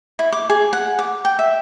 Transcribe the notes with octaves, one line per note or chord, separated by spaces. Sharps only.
E4
D6
G#4
F#5
D6
G5
E5